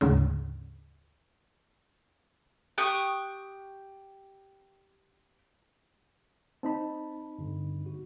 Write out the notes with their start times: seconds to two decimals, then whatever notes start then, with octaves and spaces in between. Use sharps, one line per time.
0.01 D2 G#2 C#3
2.78 G4 C#6 D#6 F#6
6.63 C4 D#4 A5 B5
7.39 G2 D3
7.86 F#4